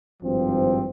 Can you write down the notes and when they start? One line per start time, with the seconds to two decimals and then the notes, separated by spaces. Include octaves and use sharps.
0.22 G#1 G2 F3 C4